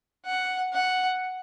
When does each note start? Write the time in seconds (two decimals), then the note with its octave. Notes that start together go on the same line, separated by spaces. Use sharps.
0.26 F#5
0.73 F#5